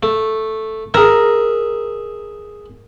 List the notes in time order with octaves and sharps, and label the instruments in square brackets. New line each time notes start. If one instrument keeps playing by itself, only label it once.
[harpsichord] A3
[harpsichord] G#4 E5 [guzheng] A#4